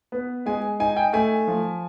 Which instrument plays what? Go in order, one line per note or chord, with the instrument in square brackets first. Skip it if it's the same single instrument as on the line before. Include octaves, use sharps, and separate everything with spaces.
[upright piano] B3
G#3 G#5
D#4 G#5
G5
A3 G#5
F3